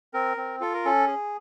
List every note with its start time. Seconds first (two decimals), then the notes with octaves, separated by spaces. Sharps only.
0.14 C4 A#4
0.37 C4
0.61 F4 A4
0.74 A#4
0.85 C#4 A4
1.07 G#4